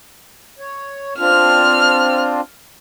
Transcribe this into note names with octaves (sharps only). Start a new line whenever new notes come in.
C#5
C4 D4 F4 F6